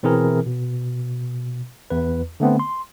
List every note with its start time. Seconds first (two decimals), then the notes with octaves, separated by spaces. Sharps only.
0.03 B2 E3 C4 E4 G#4 A#4
0.46 B2
1.90 E2 B4
2.40 D3 A3 B3 C4
2.59 C6